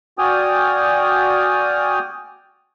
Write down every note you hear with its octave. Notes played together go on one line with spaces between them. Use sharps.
F#4 D5 G5 G#5 D#6 F6